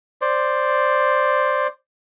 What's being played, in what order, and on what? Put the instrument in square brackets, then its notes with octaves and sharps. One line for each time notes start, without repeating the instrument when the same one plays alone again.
[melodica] C5 D5